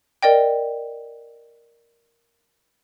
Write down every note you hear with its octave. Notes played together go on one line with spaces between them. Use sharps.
A#4 D5 D#5 G5